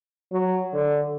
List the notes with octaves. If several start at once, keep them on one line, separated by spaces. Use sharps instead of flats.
F#3
D3